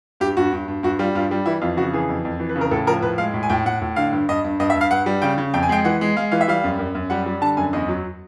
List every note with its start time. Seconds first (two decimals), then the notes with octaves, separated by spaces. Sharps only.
0.20 G2 G4
0.37 G2 F#4
0.52 G2
0.68 G2
0.83 G2 F#4
0.99 G3 F4
1.15 G2 F4
1.31 G3
1.46 E3 E4
1.61 F2 F4
1.77 C#3 F#4
1.93 E3 G#4
2.09 F2
2.25 F2
2.40 E3
2.49 B4
2.56 C#3
2.61 A#4
2.71 A2 A4
2.87 F3 A#4
3.02 A2 B4
3.18 G#3 F5
3.34 A2
3.43 G#5
3.49 A2 G5
3.66 A2 F#5
3.81 A2
3.96 D3 F5
4.12 G2
4.29 G2 D#5
4.44 G2
4.60 G2 D#5
4.70 E5
4.75 G2
4.81 F5
4.90 G2 F#5
5.06 G3
5.22 C#3 G5
5.38 C#3
5.54 F2 G5
5.63 G#5
5.69 G#3 G5
5.85 E3 F#5
6.01 G#3
6.16 G#3 F5
6.31 E3 F5
6.41 E5
6.48 G3 F5
6.64 F#2
6.79 F#2
6.95 F#2
7.10 G3 F#5
7.26 G3
7.41 D3 A5
7.57 F#2 G#5
7.73 E2 D#5
7.88 F#3